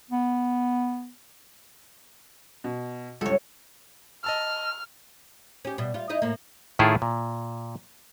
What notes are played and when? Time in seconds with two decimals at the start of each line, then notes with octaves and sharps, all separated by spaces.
0.11 B3
2.64 B2
3.21 C#2 G2 A4 C#5
4.24 D#5 A5 E6 F6
5.65 C#4 G4
5.78 B2 G3
5.94 G3 F4
6.10 D#4 E4 D#5
6.22 A2 A#3
6.79 A2 D#3 E4 F4 G#4 A4
7.02 A#2